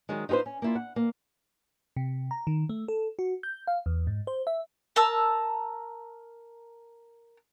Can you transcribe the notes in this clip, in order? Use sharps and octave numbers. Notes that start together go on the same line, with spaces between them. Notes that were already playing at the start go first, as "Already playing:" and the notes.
D#3 F#3 G#3
D#4 F4 G4 B4 C5
C#4
A#3 E4 F4
F#5
A#3
C3
A#5
D#3
A3
A4
F#4
G6
F5
E2
G#2
C5
E5
A#4 A5 E6